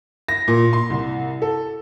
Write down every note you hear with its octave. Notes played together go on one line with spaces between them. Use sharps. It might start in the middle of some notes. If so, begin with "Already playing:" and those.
A#6
A#2
C6
C2
A4